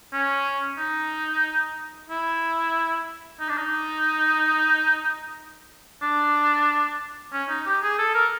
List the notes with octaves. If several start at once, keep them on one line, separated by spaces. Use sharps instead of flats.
C#4
D#4
E4
D#4
D4
D#4
D4
C#4
D#4
G4
G#4
A4
A#4